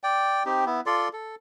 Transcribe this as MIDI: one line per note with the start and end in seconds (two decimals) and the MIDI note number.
0.04 0.43 74
0.04 0.43 79
0.46 0.65 60
0.46 0.65 63
0.46 0.65 67
0.66 0.81 59
0.66 0.81 64
0.86 1.08 65
0.86 1.08 69
0.86 1.08 74
0.86 1.08 84
1.13 1.35 69